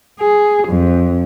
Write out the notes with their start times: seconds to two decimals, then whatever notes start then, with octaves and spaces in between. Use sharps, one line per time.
0.20 G#4
0.69 F2